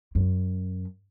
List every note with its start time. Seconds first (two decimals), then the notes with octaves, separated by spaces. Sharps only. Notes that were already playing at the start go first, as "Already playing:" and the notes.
0.15 F#2